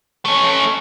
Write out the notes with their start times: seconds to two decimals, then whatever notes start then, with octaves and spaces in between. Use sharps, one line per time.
0.25 A3 C#4